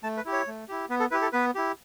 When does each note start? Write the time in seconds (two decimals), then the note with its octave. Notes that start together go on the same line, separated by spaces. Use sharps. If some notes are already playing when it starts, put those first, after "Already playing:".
0.03 A3 A5
0.17 B4
0.25 E4 G4
0.32 C#5
0.47 A3
0.68 E4 G4
0.89 B3 B4
1.00 A4
1.11 E4 G4 B4
1.22 A4
1.33 B3 B4
1.55 E4 G4